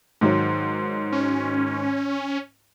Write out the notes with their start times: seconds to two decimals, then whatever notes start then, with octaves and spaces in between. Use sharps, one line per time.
0.21 G#2 D#3 F#3
1.12 C#4